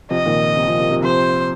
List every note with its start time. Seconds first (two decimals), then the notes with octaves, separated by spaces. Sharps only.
0.11 C3 F3 D#5
0.26 A#2 D#3
0.57 C3
0.68 C3 F3
0.80 C3
0.91 C3
1.02 C3 F3 C5